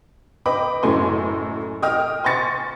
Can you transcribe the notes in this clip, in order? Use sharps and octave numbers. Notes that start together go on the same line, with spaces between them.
B4 D#5 G5 B5 D6
F#1 F#2 A2 A4 G#5 C6
D#5 G5 D#6 F6
G#5 C6 C#6 A6 C#7